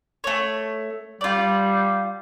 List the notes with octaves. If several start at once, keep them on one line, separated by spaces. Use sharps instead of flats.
A3 C#5
G3 F4 D5